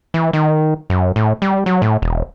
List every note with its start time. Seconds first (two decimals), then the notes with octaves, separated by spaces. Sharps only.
0.14 E3
0.33 D#3
0.90 F#2
1.16 A2
1.42 G3
1.66 F#3
1.82 A2
2.02 E1